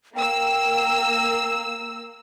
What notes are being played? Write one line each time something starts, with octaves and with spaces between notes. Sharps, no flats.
A#3 G5 E6